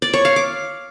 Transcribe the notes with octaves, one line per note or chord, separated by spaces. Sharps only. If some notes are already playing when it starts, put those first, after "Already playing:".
D5
C#5
F5
D6